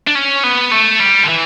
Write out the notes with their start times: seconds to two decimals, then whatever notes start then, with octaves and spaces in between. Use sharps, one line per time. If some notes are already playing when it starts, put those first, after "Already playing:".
0.07 D4
0.15 C#4
0.44 B3
0.72 A3
1.00 G3
1.24 D3
1.29 E3